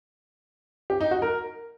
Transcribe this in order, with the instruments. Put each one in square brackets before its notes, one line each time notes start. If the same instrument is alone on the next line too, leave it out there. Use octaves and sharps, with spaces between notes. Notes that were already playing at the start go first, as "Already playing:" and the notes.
[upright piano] G4
D#4
F#4
A#4